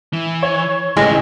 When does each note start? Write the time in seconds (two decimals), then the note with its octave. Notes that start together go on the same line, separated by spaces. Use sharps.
0.13 E3
0.43 C#5
0.97 A1 C#3 G#3 A3